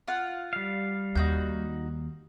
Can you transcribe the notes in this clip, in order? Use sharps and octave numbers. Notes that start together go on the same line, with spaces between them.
F4 F#5
G3 F5
D#2 D#4 F#4 G6